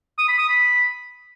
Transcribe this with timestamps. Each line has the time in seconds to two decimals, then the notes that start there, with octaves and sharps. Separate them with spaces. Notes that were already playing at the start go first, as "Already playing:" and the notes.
0.18 D#6
0.28 B5
0.38 D#6
0.48 B5